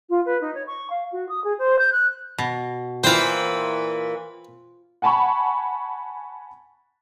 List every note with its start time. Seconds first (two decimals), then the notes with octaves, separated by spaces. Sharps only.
0.09 F4
0.25 B4
0.41 D#4
0.54 C#5
0.67 C#6
0.90 F5
1.12 F#4
1.28 D#6
1.44 G#4
1.58 C5
1.78 G6
1.92 F#6
2.38 B2
3.04 A#2 E3 F4 B4 C5 G5
5.02 F#5 G#5 A5 B5 C#6